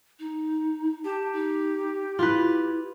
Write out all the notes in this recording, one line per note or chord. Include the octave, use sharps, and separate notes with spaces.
D#4
G4 A5
D#4
E4 F4 B4